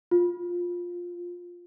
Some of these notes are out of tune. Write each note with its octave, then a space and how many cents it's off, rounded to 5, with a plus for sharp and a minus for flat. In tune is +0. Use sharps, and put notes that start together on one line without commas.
F4 +10